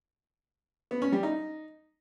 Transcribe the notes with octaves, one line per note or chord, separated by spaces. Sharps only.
B3
C#4
G3
D#4